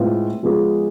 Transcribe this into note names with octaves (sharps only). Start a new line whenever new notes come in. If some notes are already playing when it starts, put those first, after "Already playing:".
Already playing: A2 G#3 C4 F4 B4
F3 G#3 B3 F4 G#4